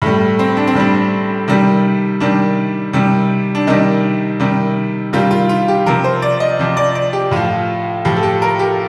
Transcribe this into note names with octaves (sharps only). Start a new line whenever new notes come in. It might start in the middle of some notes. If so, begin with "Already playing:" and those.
A2 G3 A3
C4
D4
C4
A2 G3 D4
C3 D#3 G3
C3 D#3 G3 D4
C3 D#3 G3
D4
C3 D#3 G3 D#4
C3 D#3 G3
C3 D#3 G3 F4
F4
F4
G4
C3 F3 A#4
C5
D5
D#5
C3 F3
D5
D5
G4
A2 F3 F4
A2 F3 G4
A4
G4
A#4
G4